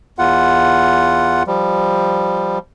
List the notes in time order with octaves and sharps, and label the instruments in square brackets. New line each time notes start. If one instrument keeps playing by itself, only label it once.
[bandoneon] E2 F4 F#5
F3 G3